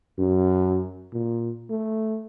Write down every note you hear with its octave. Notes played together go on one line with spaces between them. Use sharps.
F#2
A#2
A3